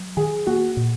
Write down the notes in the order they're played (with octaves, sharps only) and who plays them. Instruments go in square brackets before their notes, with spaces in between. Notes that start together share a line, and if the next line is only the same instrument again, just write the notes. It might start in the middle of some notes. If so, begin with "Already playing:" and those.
Already playing: [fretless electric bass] F#3
[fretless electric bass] D#3 [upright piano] G#4
[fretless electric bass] A#3 [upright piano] F#4
[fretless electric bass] A#2